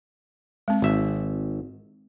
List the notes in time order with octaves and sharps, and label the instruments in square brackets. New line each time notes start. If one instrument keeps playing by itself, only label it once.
[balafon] G#3 C4
[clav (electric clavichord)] G#1 E5